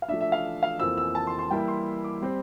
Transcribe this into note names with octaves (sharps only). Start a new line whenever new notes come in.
F5
F3 A3 D4 E5
E5
F5
F5
F2 E3 A#3 F4 C5 E6
E6
A5
C6
C6
E3 G3 A#3 E4 G5
C6
D6
G3 C4 G4 C5